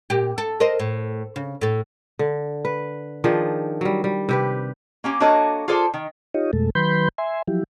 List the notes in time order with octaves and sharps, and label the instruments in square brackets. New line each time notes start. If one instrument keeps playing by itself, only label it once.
[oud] A#2 G4
A4
A#4 C5 D#5
A2
C#3
A2 A4
[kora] D3
B4
D#3 F3 D4 G#4
F#3 G3
G3
C3 G4 B4
[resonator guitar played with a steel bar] A#3 C#4 G4
A#3 D4 F#4 A4 C#5 D#5
F4 G#4 A4 C5 D5
D#3
[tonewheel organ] D#4 F4 G4 C#5 D#5
F2 B2 G#3 A3 A4
D#3 F#3 B4 B5 C6 G6
E5 G#5 C6
F3 F#3 E4 G4